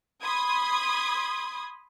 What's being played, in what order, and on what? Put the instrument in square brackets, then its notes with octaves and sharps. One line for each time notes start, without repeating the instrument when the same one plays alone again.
[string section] B5 C6 D#6 G#6